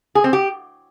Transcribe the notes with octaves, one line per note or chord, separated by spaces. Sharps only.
G#4
C4
G4